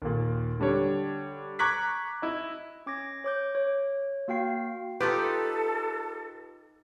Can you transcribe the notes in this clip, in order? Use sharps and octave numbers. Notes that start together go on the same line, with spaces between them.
D#2 A#2
D3 G3 D4 C#5
A#5 C#6 D6 F#6 G#6 B6
E4 D#5
C#4 D6 G#6 A#6
C#5 D6 G6
C#5
A#3 F#4 F5 G5 C7
D#4 F4 G4 A4 B4 D6